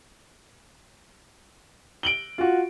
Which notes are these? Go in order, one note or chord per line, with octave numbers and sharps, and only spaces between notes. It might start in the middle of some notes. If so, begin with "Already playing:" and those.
D7 F#7 G7
F4 F#4